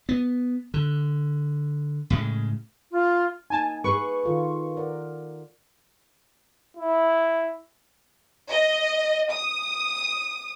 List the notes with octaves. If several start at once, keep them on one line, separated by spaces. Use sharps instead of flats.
B3
D3
A2 C#3 G#3
F4
A#3 D#4 G#5 A5
G#4 B4 C#6
D#3 F4 A4
A#4 D5 F#5
E4
D#5
D#6